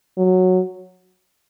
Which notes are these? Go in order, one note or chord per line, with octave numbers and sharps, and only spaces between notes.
F#3